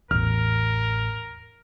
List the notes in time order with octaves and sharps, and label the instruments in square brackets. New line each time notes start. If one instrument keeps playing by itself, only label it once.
[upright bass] A1 [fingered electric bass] E2 [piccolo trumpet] A#4 [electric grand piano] F6